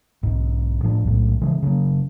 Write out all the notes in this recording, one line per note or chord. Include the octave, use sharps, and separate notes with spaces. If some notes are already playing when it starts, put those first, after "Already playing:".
B1 G#2
A2 F3 D4
B1 A2
C#3 E3 F3 G#3
C#3 F#3 A3 A#3